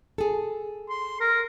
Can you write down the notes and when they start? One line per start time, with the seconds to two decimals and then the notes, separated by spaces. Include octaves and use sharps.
0.18 G#4 A4
0.90 C6
1.20 A#4